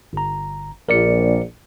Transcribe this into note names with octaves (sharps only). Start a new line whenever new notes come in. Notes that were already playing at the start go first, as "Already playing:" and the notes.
G1 A#5
A#1 A#4 D5 C#7